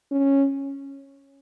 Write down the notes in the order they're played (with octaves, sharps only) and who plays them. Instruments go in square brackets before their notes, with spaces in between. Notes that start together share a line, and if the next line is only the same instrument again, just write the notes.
[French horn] C#4